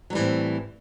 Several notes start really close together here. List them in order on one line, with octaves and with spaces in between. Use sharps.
F#3 G3 E3 A2 C4